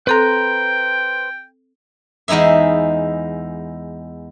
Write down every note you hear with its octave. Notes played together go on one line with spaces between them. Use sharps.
C4 A4 B4 C5 G5 A#5 F#6
E2 G#3 D#4 E4 E5